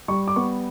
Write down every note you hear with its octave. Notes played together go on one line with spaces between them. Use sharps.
G3 C#6
D6
B3 C#6